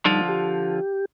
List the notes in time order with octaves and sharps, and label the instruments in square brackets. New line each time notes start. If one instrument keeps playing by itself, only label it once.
[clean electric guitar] D3 F3 F4 [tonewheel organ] G3 D#4
[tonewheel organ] G4